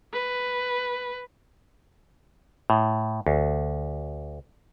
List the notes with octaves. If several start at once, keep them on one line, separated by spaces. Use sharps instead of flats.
B4
A2
D2